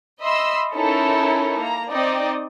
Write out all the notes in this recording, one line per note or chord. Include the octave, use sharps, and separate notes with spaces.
D#5 E5 B5 C6 E6
C#4 D#4 E4 A4 A#4
A#3 A#5
C4 D#4 D5 D#5